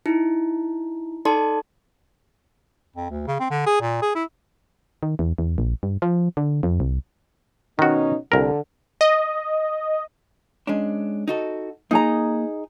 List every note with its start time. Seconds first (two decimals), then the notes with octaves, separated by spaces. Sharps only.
0.06 D#4 E4
1.25 D#4 A4 D5 A5 C6
2.96 F2
3.11 D2
3.27 C#3
3.39 C4
3.50 D3
3.66 G#4
3.81 A#2
4.02 G#4
4.15 E4
5.03 D#3
5.19 E2
5.38 E2
5.58 A#1
5.83 G2
6.02 F3
6.37 D3
6.63 F2
6.80 C2
7.79 B2 D#3 C#4 D#4 F#4
8.32 C2 D3 A#4
9.01 D#5
10.67 G#3 C#4 D4
11.28 D#4 F#4 A4
11.91 A#3 D#4 G#4 A#5